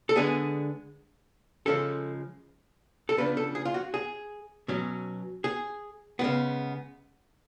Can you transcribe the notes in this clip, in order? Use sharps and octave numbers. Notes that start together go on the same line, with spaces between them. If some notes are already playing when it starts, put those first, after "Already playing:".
A4
D3 G#3 B3 D4 G#4
C#3 F3 G#3 C#4 A4
A4
C#3 F3 B3 D4 B4
A4
G#4
F4
F#4
G#4
B2 F#3 C#4
G#4
C#3 G#3 B3